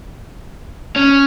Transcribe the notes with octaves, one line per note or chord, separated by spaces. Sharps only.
C#4